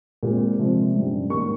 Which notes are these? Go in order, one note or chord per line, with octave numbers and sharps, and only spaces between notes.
A#2 G#3 C4
C3 F3 G#3 C4
G2 G3 C#4
G#2 D#3 A#3 C#6